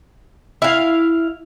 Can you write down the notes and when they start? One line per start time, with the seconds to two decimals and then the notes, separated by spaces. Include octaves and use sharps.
0.62 E4 F5